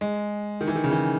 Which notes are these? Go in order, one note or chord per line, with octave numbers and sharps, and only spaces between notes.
G#3
D#3
E3
D#3
C#3
E3